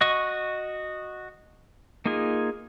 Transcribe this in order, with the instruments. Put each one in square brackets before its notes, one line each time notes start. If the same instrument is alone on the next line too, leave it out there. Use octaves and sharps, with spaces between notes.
[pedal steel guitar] F#4 D#5 C#6
A#3 D#4 F4 G#4